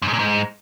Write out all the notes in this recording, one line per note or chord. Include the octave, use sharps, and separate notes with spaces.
F#2
G#2
A#2
G#2